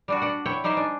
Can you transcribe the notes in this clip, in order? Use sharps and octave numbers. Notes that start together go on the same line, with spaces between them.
G3 D4 F#4
D4 F#5
E4 C#5 G5
G3 D#4 G4 C5 D#5 G#5
D4